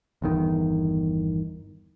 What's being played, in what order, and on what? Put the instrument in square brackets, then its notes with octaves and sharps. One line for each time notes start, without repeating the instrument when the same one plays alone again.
[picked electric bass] G1 E2 D#3